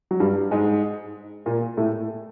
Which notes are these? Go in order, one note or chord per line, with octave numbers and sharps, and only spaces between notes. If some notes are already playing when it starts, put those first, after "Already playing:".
F#3
G2 G3
G#2 G#3
A#2 A#3
A2 A3